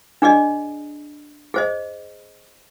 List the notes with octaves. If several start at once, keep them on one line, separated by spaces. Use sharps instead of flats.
D4 G#4 D5 D#5
G#4 C5 D#5